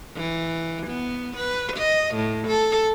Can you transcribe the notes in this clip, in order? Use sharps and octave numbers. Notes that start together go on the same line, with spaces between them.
E3
B3
B4
D#5
A2
A4